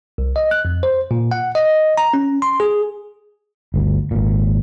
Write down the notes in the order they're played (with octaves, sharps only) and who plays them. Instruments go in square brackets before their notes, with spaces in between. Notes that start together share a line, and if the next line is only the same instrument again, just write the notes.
[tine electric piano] C2
D#5
F#6
F2
C5
A#2
F#5
D#5
A#5
C#4
C6
G#4
[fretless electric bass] G1 D2
G#1 A#2